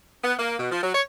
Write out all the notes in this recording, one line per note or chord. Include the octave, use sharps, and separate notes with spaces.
B3
A#3
B2
F3
F#3
C#5